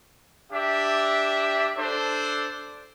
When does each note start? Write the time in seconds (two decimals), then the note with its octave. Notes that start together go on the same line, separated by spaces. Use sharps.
0.53 D4 G4 E5
1.78 D4 A4 C5